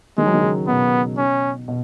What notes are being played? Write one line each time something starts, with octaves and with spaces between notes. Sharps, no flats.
D#3 G#3
F#3
D#3
C#3
B2 B3
C#4
B2